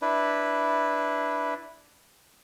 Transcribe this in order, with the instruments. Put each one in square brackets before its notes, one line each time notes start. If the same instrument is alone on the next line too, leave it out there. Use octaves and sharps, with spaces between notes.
[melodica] D4 E4 B4